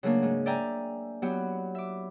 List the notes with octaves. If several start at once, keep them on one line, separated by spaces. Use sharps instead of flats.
C#3 F#3 A3 A#3 D4
G#2
D5 E5 G5 G#5 A#5
F#3 B3 E4 F#4 G4
E5 D6